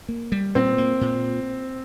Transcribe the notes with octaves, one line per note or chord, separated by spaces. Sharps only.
A#3
G3
A#2 C4
A#3
A#2